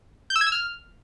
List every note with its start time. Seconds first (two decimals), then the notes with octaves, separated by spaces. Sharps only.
0.30 G6
0.36 E6
0.41 G#6
0.47 E6
0.52 F6